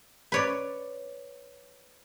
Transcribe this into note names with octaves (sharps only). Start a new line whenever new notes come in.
B4 C#5 D5